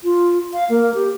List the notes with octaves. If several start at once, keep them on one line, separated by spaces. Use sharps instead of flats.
F4
F5
A#3
G4